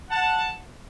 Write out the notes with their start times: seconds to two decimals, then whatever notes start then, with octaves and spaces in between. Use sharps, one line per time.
0.09 F#5 A5